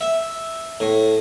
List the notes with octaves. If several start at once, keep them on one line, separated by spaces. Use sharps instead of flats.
E5
A2